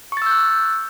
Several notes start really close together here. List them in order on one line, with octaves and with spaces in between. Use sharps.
C#6 A6 E6 G6 F#6